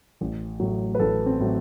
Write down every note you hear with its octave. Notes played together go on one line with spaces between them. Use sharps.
A1
A2 F#3
B4
A1 A4
C4
A2 F#3